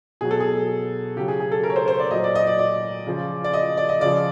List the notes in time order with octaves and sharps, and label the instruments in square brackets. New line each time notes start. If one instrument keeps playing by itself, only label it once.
[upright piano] B2 F#3 G#4
A4
G#4
C#3 F#3 G4
G#4
G#4
A4
A#4
C#5
C5
C5
D5
A#2 F#3 D#5
D5
D#5
D5
D5
C#3 F3
D5
D#5
D5
D#5
C#3 F3 D5